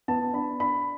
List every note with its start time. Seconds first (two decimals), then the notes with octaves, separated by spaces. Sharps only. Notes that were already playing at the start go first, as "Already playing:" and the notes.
0.08 B3 A5
0.33 D4 B5
0.60 D4 B5